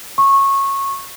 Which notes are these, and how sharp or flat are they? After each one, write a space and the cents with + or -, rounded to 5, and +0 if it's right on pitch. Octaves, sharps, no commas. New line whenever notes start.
C#6 -15